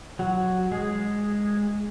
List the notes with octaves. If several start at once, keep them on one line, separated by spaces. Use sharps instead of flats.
F#3 F#4
G#3 G#4